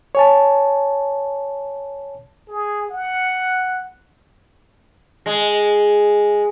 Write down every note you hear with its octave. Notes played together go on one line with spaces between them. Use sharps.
C#5 G#5 A5
G#4
F#5
G#3